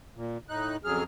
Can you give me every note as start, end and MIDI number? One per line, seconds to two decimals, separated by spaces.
0.16 0.38 46
0.49 0.77 45
0.49 0.77 63
0.49 0.77 90
0.84 1.04 41
0.84 1.04 49
0.84 1.04 54
0.84 1.04 68
0.84 1.04 89